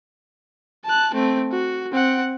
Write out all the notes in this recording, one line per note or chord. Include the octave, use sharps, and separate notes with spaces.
A5 F#6
A3 C4
F#4
C4 F#5